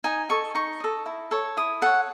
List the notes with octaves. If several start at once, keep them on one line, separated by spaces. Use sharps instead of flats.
D#4 G#5
A4 D#5 C#6
D#4 C#6
A4 D#5
E4
A4 C#5
E4 D#6
A4 C#5 F#5